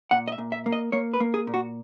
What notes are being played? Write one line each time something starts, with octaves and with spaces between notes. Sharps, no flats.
A#2 F#5
D#5
E5
A#2
E5
A#3
D#5
A#3 C#5
B4
A#3
G#4
A#2
F#4